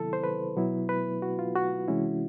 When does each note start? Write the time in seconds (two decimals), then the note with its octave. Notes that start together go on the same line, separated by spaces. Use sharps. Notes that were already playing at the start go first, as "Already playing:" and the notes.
Already playing: C3 D#3 F#3 B3 E4 A4
0.13 C5
0.24 B4
0.56 B2 F#3 B3 E4
0.89 B4
1.22 F#4
1.39 F4
1.56 F#4
1.88 C3 E3 G#3 C#4 E4